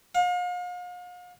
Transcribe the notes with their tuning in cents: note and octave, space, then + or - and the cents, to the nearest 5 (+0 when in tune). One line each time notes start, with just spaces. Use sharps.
F5 +40